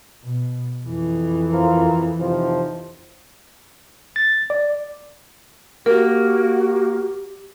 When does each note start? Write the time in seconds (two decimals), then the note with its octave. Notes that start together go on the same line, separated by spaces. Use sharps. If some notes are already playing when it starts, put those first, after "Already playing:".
0.24 B2
0.86 F2 E3
1.52 F4 A#4 C5
2.19 C3 D#3 F3
4.16 A6
4.50 D5
5.86 A#3 F#4 G4 A#4